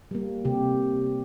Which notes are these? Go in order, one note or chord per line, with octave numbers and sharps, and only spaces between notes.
G3 A#3
C3 G4